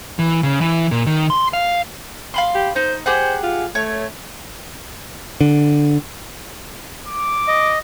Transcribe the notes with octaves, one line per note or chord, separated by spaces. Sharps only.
E3
C#3
E3
A#2
D#3
C6
F5
F5 B5 C6
G4
D#4 C5
G4 G#4 C5 F#5
F4
A3 C#5
D3
D6
D#5